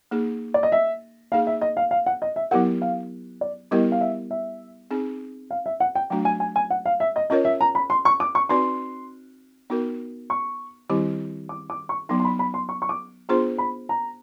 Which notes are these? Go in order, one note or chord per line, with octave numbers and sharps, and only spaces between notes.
A#3 D#4 G#4
D5
D#5
E5
A#3 D#4 G#4 F5
E5
D#5
F5
F5
F#5
D#5
E5
F#3 B3 E4 G4 A#4 F#5
F5
D5
G3 B3 E4 G4 A#4 D#5
F5
E5
E5
C4 D#4 G#4
F5
E5
F#5
G5
F#3 A3 D4 F#4 G5
G#5
G#5
G#5
F#5
F5
E5
D#5
C#4 F4 A#4 C#5 D#5
E5
A#5
B5
C6
C#6
D6
C#6
C4 D#4 F#4 B4 D5 C6
B3 D#4 F#4 A#4
C#6
D#3 G3 C4 E4 G4
D6
D6
C#6
F#3 B3 D#4 C6
C6
B5
B5
C6
C#6
C#6
D6
B3 D4 F4 G#4 C5 C6
B5
A#5